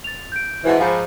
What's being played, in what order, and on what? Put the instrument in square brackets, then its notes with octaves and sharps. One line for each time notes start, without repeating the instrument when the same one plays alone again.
[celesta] A6 F7
G6 D7
[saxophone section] G#2 B2 E3 [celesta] C5 F#5
[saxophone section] G#2 F3 [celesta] F5 G#5 B5